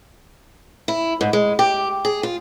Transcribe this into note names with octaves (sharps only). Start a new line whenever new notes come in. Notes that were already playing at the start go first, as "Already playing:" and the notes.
E4
G#2
G#3
G4
G#4
F4